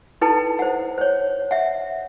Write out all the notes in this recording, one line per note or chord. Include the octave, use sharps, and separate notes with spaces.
D#4 E4 A4 B4 G5 A5
C5 F#5
C5 C#5
E5 F#5